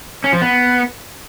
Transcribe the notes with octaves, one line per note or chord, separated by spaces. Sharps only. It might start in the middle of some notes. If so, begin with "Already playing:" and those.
C#4
F3
B3